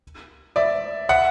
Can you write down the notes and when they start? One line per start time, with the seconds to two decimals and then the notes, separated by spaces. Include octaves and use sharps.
0.56 D5 E5
1.09 E5 F#5